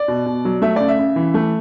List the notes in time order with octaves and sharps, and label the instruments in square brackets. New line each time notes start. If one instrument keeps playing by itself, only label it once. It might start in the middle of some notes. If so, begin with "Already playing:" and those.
Already playing: [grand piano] D5
B2
B2
F#3
A3 E5
C#3 D5
E5
C#3
E3
A3